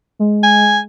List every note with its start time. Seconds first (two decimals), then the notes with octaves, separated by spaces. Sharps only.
0.19 G#3
0.43 G#5